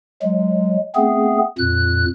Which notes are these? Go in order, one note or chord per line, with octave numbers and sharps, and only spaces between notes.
F#3 G#3
A3 B3 C4 G#4
F2 A#2 F#6